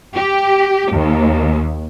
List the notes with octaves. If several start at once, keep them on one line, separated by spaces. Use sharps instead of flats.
G4
D#2